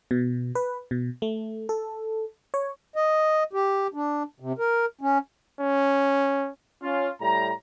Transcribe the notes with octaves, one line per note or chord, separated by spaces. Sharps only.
B2
B4
B2
A3
A4
C#5
D#5
G4
D4
C3
A#4
C#4
C#4
C#4 F4
A2 G3 A#5